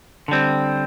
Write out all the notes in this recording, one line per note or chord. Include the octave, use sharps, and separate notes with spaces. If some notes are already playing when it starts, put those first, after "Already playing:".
D3 G3 C4